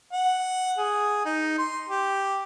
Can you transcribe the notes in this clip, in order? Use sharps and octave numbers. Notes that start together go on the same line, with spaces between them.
F#5
G#4
D#4
C6
G4